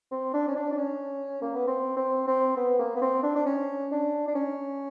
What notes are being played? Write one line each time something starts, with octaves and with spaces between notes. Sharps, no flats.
C4
D4
C#4
D4
D4
C#4
A#3
B3
C4
C4
C4
B3
A#3
B3
C4
D4
D4
C#4
D4
D4
C#4